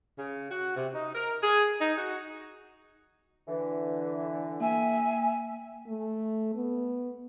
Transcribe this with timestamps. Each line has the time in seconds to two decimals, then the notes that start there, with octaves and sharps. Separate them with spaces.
0.19 C#3
0.51 F#4
0.76 C3
0.95 D#4
1.15 A#4
1.43 G#4
1.80 D#4
1.98 F#4
3.48 D3 E3
4.60 A#3 E5 G5 G#5
5.87 A3
6.56 B3